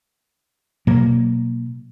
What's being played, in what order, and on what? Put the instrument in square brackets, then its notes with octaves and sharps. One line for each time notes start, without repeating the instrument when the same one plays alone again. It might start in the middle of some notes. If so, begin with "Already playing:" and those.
[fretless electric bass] B2 F#3 A#3